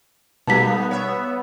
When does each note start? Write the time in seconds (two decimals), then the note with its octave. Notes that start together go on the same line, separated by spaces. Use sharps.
0.47 B2 G3 G#3 A#3 B3 D#4 A5 B6
0.91 C#5 E5